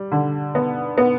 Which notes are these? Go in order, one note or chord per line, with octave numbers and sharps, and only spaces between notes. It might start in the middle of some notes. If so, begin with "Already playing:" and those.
Already playing: G3
D3
B3
B3